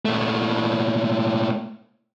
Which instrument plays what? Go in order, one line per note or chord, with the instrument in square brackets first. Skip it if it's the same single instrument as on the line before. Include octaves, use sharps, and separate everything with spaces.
[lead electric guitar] A#2 A3